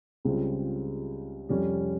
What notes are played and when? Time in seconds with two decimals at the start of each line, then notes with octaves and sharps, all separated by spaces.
0.25 C#2 C#3 G3 C4 F4
1.49 F2 C3 G3 C#4